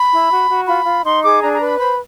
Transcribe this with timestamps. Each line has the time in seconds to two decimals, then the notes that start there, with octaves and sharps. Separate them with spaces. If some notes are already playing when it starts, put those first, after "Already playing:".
Already playing: B5
0.12 E4
0.31 F#4
0.50 F#4
0.68 F4 B5
0.86 F4
1.05 D#4 C6
1.23 G#4 D6
1.41 D4 A#5
1.54 A#5
1.60 B4
1.67 B5
1.79 C5 B5